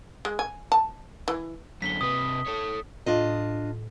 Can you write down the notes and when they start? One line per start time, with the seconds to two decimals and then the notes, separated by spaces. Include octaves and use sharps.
0.25 G#3
0.39 G#5
0.72 A5
1.28 E3
1.82 F#2 D3 B6 G7
2.01 C3 B4 D#6
2.46 A4 C#5
3.06 A2 D4 F4 D#5